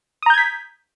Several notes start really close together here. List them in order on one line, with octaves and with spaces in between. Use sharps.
D#6 A#5 G6 G#6 B6